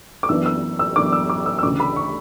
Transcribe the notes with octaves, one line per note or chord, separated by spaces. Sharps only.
D6
F#2 E3 B3 D4 E6
E6
E6
F#2 E3 B3 D4 D6
E6
D6
E6
E6
D2 C#3 E3 D6
B5
C#6